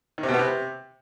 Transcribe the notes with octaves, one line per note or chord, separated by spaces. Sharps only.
D#3
C3
B2
B3
C3